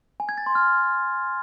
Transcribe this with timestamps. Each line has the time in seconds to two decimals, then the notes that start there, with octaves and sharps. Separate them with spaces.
0.20 G#5
0.29 G#6
0.38 A6
0.46 C6
0.55 F6